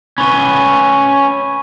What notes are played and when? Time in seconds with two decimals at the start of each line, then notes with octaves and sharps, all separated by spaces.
0.18 C#4 B4 B5 C#6 D#7